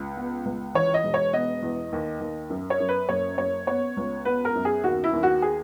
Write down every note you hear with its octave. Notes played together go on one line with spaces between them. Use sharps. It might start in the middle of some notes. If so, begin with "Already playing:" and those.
Already playing: C#2
B3
C#2
E3 C#5
D#5
E1
C#5
B3 D#5
E2
D#2
D#2
F#2
C#5
F#2
B4
F#1 C#5
F#1 C#5
B3 C#5
C#2
B3 B4
A#4
F#2
G#4
D#2 F#4
E4
D#2
F#4
G#4